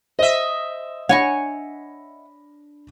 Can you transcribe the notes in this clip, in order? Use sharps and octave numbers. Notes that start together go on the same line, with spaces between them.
C5 D#5 E5
D4 C#5 F#5 G#5 B5 C#6 A#6